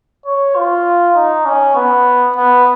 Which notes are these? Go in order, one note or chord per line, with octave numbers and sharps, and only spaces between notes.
C#5
F4
D#4
C#4
B3
B3